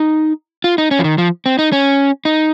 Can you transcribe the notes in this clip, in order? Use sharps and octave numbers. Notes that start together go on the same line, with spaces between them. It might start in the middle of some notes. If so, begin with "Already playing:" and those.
Already playing: D#4
F4
D#4
C#4
F3
D#3
F3
C4
D#4
C#4
D#4